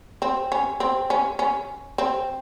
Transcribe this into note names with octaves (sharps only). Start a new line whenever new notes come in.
C4
C#4
C4
C#4
C#4
C4